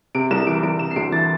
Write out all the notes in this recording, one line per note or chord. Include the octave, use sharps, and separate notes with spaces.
C3 D7
C2 E7
E3 D7
C2 D7
C3 E7
C7
D2 D7
E3 A6